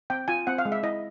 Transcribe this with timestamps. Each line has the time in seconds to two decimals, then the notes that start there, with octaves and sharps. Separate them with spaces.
0.10 C4 G5
0.28 F4 G#5
0.47 C4 F#5
0.58 F5
0.65 G#3
0.72 E5
0.83 E4 D#5